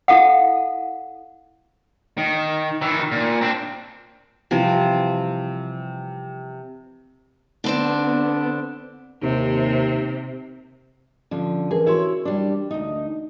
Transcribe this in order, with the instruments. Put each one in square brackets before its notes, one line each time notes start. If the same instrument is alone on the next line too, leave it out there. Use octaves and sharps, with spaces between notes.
[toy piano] E4 A4 F5 F#5
[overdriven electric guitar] D#3
D#3 E3
A#2
C4 D4
[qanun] C3 E3 F3 G3
[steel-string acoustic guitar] D3 C4 D4 [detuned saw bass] B3
[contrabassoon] D#2 [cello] C3
[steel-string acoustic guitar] D3 F3 [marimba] C#4
[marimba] E3 A#4 B4 [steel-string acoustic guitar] G#4
[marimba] E3 F#4 C6 [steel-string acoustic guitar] E4 C#5 E5
[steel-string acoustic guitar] G3 D4
D2 D#4